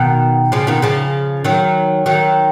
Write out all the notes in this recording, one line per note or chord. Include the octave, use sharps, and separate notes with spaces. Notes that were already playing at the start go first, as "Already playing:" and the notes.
Already playing: B2 D#3
C#3 F3
B2 D#3
C#3 F3
D#3 F#3
D#3 F#3